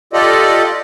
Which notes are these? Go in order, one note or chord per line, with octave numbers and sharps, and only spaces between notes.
F4 G4 A4 D5 D#5